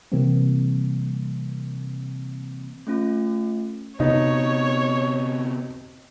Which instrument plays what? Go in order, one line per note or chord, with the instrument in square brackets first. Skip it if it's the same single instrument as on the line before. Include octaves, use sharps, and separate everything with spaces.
[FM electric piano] C3 E3 G3 A#3 C4
[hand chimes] A3 C#4 F4
[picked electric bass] C3 B3 [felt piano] D#4 [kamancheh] C#5